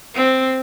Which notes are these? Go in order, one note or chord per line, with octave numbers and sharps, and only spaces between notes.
C4